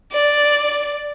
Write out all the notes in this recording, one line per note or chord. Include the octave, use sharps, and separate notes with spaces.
D5